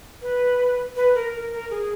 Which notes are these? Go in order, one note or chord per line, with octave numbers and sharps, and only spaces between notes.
B4
B4
A#4
A#4
A#4
G#4